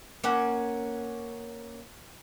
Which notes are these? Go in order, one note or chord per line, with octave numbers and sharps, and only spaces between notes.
A#3 C#4 F#5